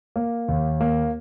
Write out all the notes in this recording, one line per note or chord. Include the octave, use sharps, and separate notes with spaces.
A#3
D#2
A#3